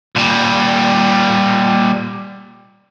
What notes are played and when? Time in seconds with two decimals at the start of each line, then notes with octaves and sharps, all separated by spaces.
0.16 A#2 G3